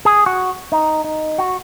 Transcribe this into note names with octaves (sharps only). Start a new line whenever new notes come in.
G#4
F#4
D#4
D#4
F#4